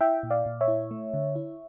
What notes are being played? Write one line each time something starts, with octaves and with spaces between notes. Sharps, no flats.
E4 E5 G5
A#2
D5 F5
A#2
C#5 E5
E4
A3
D3
E4